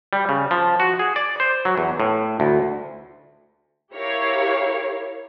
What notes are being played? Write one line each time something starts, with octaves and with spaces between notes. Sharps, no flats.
G3
C#3
F3
F#4
G#4
D5
C5
F#3
E2
A2
D2
E4 G4 A#4 C#5 F5